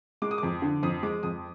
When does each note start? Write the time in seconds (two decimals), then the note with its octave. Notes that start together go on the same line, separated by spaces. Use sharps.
0.22 G#3 D6
0.31 D#6
0.38 F2 D6
0.62 D3
0.83 F2 D#6
1.03 G#3 D6
1.23 F2 D#6